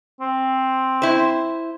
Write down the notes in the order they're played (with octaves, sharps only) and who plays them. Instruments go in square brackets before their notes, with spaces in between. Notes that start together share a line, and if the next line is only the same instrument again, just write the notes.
[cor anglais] C4
[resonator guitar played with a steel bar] E4 C5